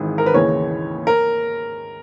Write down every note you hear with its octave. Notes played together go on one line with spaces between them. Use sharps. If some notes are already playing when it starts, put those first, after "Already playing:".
Already playing: G#1 G#2 E3
A#4
B4
D#2 C#3 E3 C#5
A#4